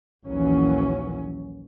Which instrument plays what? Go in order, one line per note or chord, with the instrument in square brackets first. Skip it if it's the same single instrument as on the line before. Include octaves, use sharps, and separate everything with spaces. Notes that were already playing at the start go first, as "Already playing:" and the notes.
[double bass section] A#1 D#2 E3 F#3 C#4